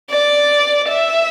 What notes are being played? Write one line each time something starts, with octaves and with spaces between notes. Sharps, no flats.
D5
E5